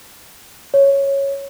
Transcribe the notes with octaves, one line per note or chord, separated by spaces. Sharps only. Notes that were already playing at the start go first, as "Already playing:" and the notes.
C#5